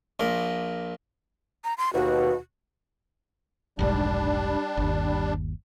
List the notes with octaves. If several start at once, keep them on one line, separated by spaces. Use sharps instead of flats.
A#1 A#2 A#4
A#5
C6
D#2 B2 F#4
F1 B1 G#2 G3 D4
G1 D#2